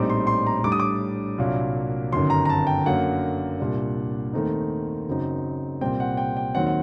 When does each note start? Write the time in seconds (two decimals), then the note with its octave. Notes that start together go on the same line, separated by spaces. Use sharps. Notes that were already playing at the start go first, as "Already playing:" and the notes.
Already playing: A#1 A2 G3 C4 D#4 D6
0.10 C6
0.27 C6
0.46 A#5
0.64 A2 G3 D4 D6
0.72 D#6
0.80 D6
1.38 C2 A#2 F#3 A#3 D4
2.12 G1 F#2 D#3 F#3 C6
2.30 A#5
2.45 A#5
2.49 A5
2.67 G5
2.86 F#2 D3 F#3 A#3 F#5
3.60 C2 A#2 G3 D4
4.34 D#2 D#3 A3 C4 D#4
5.07 F#1 F#2 F#3 C4 D#4
5.81 C2 A#2 G3 C4 G5
6.00 F#5
6.17 G5
6.37 G5
6.55 D#2 D#3 F#3 C4 F#5
6.66 F#5